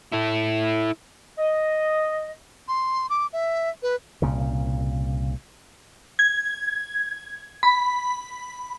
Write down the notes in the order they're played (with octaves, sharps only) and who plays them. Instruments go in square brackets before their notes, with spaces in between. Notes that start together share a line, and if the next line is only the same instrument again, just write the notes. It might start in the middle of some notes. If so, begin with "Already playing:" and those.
[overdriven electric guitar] E4 A4
[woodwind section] D#5
[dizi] C6
D6
E5
B4
[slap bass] C2 A#2 C#3
[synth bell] G#6
B5